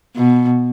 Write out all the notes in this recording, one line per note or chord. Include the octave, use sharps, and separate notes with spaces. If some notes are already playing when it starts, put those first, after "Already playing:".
B2